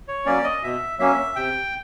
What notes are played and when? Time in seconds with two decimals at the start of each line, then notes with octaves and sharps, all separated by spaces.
0.08 C#5
0.25 F#3 A#3 C#4 D5
0.44 D#5
0.63 B2 E5
0.99 F#3 A#3 C#4 E5
1.36 C3 G5